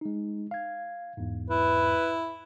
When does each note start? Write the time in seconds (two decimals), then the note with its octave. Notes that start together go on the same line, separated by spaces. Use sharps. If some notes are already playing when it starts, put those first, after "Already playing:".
0.01 G#3 D#4
0.51 F5 G#6
1.17 E2 G#2
1.50 E4 B4